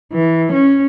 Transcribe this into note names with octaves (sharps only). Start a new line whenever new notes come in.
E3
C#4